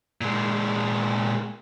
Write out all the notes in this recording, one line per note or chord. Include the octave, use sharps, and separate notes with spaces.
A#2 G#3